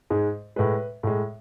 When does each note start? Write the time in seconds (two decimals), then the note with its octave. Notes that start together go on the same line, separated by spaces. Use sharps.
0.10 G#2 G#3
0.56 A2 G#3 B4
1.03 A2 G#3